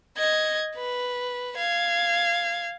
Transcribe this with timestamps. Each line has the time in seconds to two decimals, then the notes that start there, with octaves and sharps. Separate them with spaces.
0.17 D#5 G#6
0.76 B4
1.57 F5 G#6